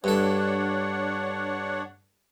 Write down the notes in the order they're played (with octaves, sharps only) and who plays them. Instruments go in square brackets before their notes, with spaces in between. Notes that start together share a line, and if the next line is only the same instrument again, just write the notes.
[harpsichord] G2 A4 [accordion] D4 C#5 F#5